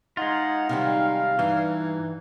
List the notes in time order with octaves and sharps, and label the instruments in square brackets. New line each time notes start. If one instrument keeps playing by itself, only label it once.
[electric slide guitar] G#3 F4 [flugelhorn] D#4 [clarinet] F#5
[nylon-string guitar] C3 D#3 G3 [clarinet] D#4 [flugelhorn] F5
[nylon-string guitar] G2 [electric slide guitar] E3 [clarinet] D#4